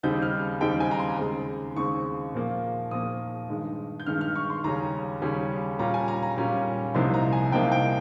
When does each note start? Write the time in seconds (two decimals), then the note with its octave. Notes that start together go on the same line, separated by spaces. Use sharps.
0.03 D#2 C#3 G3 C4 D#4 G6
0.22 F6
0.61 D#2 C#3 G3 C4 D#4 G5
0.80 G#5
0.91 A#5
0.99 C6
1.19 D#2 C#3 G#3 C4
1.76 D#2 C#3 G#3 C4 C#6
2.34 A#2 F3 A#3
2.91 A#2 F3 A#3 D#6
3.49 G2 D#3 G#3
4.00 G6
4.06 G2 D#3 G#3 F6
4.21 F6
4.35 C#6
4.50 C6
4.64 D#2 C#3 G3 C#4 A#5
5.22 D#2 C#3 G3 C#4
5.79 A#2 G3 C#4 F4 A#5
5.94 G#5
6.08 A#5
6.23 A#5
6.37 A#2 G3 C#4 F4
6.94 C2 C3 F3 A#3 D#4 C6
7.14 A#5
7.33 G#5
7.52 C2 C3 F3 A#3 D#4 G5
7.72 G5